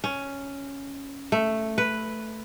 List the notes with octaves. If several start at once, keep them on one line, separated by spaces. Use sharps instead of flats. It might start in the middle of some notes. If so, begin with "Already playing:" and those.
C#4
A3
B4